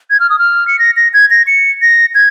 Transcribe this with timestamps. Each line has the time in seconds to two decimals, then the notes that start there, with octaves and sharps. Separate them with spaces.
0.10 G#6
0.20 F6
0.30 D#6
0.39 F6
0.68 C#7
0.79 A#6
0.97 A#6
1.14 G#6
1.31 A#6
1.47 C#7
1.82 A#6
2.15 G#6